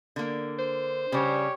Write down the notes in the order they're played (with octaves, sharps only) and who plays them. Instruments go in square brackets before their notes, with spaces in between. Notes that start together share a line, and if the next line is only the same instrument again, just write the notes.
[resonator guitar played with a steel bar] D3 A#3
[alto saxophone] C5
[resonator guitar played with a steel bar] C#3 G3 [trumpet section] G4 C#5